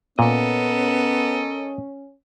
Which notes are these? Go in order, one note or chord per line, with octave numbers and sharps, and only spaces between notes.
A#2 B3 C#4 A4 A#4 D#5